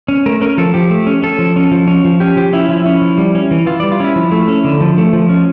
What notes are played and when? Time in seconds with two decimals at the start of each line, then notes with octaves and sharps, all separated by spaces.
0.08 C#4
0.26 A3 A#4
0.41 C#4 A#4
0.58 F3 A4
0.74 F3 G4
0.90 A3
1.07 C#4
1.22 C#4 A4
1.39 F3
1.56 C#4
1.72 F3
1.87 C#4
2.05 F3
2.20 C#4 G4
2.37 F3 G4
2.53 C#4 E4
2.69 F3 E4
2.86 C#4
3.02 F3
3.18 G3
3.35 C#4
3.51 E3
3.66 E3 F4
3.80 G3 D5
3.92 F4
4.00 C#4 E4
4.16 F3
4.32 A3
4.48 C#4
4.64 D3
4.81 F3
4.98 A3
5.13 F3
5.29 C#4